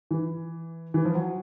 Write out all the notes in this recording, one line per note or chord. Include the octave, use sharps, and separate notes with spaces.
E3
E3
F3
F#3